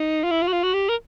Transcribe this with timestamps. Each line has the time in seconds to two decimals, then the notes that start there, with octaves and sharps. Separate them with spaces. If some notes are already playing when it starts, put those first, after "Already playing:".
Already playing: D#4
0.24 F4
0.31 E4
0.42 F4
0.47 F#4
0.52 F4
0.63 F#4
0.74 G4
0.89 A#4